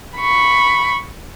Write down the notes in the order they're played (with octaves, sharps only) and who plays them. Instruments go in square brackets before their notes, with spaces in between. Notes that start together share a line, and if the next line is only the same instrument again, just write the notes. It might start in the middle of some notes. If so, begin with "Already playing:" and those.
[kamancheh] B5 C#6